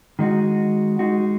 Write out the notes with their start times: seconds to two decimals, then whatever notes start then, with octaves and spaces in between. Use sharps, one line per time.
0.19 D#3 G#3 D#4 F#4
0.99 G#3 D#4 F#4